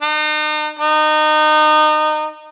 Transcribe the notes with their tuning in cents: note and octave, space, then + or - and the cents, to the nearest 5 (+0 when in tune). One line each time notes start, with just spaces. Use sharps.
D#4 -40
D#4 -25